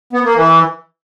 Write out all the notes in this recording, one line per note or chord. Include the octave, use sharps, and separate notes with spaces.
B3
A#3
E3